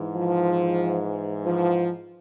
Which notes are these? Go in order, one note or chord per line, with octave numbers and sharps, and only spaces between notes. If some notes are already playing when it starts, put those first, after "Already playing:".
Already playing: G#2 E3
F3
F3